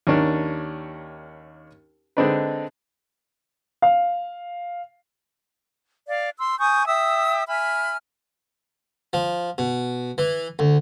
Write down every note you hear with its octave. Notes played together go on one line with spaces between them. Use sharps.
D#2 C#4 D4 A#4
D3 G#3 C4 D4 D#4 B4
F5
D5 F5
C6 E6
G#5 C#6 D#6 G6
E5 G5 D#6 E6
E5 G#5 B5 F6
F3
B2
E3
D2